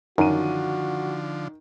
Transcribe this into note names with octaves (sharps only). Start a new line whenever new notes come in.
F#2 D3 D#3 F3 F#4 D#7